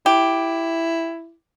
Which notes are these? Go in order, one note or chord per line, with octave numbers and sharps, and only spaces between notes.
E4 G4